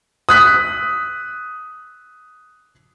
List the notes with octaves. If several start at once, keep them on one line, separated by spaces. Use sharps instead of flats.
D#6 F#6 B6